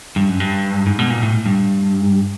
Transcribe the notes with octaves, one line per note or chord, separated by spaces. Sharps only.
G2
F#2
G2
G#2
B2
A#2
A2
G2